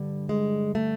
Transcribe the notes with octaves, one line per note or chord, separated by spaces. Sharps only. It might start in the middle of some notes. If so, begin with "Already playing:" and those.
Already playing: G2 D3 G3
G#3
A3